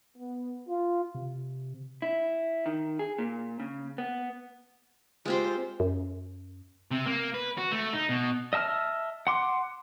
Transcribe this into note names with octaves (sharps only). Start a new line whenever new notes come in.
B3
F4
C3
E4
D#3
G#4
A#2
C#3
B3
G#3 C4 F4 G4 C5
F#2
C3
A#3
B4
F#4
A3
D#4
B2
D#5 E5 A5 E6 F6
F#5 C6 D6